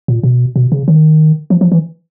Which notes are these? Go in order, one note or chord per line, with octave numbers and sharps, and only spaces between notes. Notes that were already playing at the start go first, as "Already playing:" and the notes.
A#2
B2
B2
C#3
D#3
F3
F3
E3